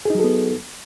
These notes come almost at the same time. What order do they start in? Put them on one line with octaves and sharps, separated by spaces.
G#4 D#4 F#3 A4 B3